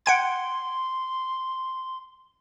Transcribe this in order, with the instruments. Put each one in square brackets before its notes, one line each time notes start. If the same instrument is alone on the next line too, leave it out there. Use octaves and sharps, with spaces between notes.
[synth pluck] F#5 G5 G#6 [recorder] C6